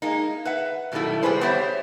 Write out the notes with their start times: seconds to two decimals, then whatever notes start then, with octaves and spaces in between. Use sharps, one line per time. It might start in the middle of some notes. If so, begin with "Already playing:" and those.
0.02 G#3 A#3 D#4
0.45 B4 E5 F#5
0.92 F#2 B2 D#3 G3 A3 E4
1.23 C3 G3 G#3 G#4 B4 C5
1.41 B3 G4 C5 C#5 E5